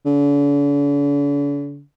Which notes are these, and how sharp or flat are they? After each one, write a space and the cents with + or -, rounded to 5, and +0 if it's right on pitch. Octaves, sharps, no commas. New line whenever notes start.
D3 -45